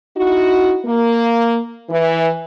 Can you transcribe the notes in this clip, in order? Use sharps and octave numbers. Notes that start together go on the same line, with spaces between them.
D#4 E4 F#4
A#3
E3